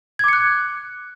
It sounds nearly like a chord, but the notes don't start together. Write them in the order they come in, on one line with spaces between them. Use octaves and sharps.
G#6 D6 C#7 F#6